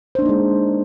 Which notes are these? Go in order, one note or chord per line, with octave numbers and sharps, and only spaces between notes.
G#3 A#3 D4 D#4 C5